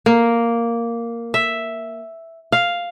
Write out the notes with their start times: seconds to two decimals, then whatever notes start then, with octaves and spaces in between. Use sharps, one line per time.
0.06 A#3
1.34 E5
2.52 F5